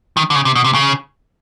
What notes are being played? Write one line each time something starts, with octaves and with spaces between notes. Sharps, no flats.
D#3
D3
C#3
C3
B2
C3
C#3